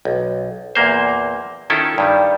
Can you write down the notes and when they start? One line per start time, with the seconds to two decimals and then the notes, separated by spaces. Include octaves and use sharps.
0.05 B1
0.75 E2 A#2 A#3 C5
1.70 D#3 C#4 E4 F4 A4
1.98 G2 D#3 G3